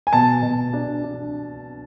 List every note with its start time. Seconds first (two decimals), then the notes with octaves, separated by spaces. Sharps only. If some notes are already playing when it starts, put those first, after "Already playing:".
0.07 G#5
0.13 B2 A5
0.43 B2
0.73 D4
1.04 D4